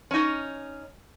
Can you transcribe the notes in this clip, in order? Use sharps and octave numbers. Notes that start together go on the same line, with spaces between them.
C#4 D#4